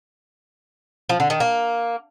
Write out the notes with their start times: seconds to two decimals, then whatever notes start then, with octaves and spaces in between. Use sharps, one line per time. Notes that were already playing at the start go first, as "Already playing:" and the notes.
1.09 F3
1.20 D3
1.30 D#3
1.40 A#3